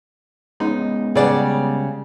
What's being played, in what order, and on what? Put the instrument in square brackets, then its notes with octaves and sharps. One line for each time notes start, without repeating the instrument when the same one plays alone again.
[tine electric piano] G#3 B3 C#4 [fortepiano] D#4
[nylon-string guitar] C#3 G3 [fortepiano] G#4 D5 F#5